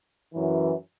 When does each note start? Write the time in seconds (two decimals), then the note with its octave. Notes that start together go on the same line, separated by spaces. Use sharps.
0.34 F#2 E3